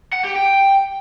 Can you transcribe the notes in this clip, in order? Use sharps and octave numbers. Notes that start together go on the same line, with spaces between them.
F#5
G4
G5